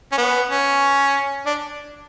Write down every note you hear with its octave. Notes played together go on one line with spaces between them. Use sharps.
C#4
B3
C#4
D4